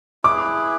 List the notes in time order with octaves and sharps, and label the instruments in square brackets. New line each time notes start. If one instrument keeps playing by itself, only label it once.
[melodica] E4 G#4 B4 [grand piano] D6